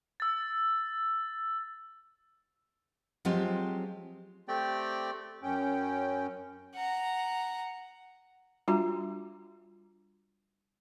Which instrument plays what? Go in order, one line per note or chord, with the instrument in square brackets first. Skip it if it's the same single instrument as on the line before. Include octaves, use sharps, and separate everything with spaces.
[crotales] E6 A6
[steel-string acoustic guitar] F3 F#3 G#3 C4 F4 G4
[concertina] A3 C4 G4 D5 G5
[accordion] F#2 C#4 G5
[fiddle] F#5 A#5
[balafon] G3 D4 F4 F#4 A#5